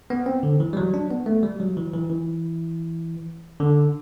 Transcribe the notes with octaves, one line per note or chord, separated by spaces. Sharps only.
B3
C4
D3
E3
G3
F#3
D4
B3
A3
G3
F#3
E3
E3
E3
D3